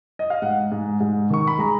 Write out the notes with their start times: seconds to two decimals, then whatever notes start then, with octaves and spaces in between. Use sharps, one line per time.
0.19 D#5
0.30 F5
0.42 G#2 F#5
0.72 G#2
1.01 G#2
1.30 D#3 C#6
1.47 B5
1.58 G#3 A#5